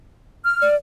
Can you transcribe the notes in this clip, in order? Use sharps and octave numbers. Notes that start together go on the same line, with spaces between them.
F6
D5